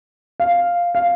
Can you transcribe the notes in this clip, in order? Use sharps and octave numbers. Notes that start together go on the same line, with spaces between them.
F5
F5